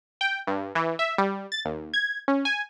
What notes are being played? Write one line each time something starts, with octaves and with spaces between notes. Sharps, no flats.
G5
G2
E3
E5
G3
A6
D#2
G#6
C#4
G#5